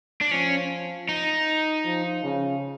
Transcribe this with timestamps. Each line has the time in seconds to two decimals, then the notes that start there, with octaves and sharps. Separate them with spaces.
0.21 D4
0.31 F3 C#4
1.09 D#4
1.85 F3
2.24 C#3